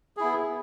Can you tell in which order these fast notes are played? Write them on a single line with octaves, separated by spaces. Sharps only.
G#4 E4 B3